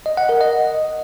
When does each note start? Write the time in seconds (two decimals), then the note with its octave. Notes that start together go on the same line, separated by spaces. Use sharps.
0.06 D#5
0.17 F#5
0.29 A#4
0.41 D#5